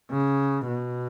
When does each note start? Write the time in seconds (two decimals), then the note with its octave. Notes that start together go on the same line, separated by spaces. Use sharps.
0.11 C#3
0.67 B2